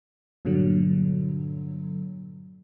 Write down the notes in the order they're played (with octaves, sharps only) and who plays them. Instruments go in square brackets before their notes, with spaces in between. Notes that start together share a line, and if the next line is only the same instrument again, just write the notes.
[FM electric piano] G2 A#2 D3 F#3